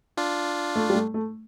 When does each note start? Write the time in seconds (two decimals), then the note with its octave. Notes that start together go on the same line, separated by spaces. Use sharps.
0.17 D4 F4
0.76 A3
0.90 G3
0.95 A3
1.14 A3